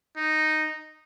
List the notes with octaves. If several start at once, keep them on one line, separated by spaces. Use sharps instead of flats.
D#4